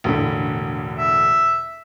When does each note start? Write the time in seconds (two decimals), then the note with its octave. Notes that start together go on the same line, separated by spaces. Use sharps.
0.04 E1 A2 D3
0.98 E5